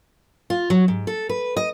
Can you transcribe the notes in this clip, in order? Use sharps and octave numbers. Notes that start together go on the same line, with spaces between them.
F4
F#3
G#2
A4
B4
D#5